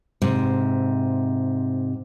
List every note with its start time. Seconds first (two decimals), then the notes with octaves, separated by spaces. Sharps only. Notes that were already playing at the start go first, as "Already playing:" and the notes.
0.22 G#2 C3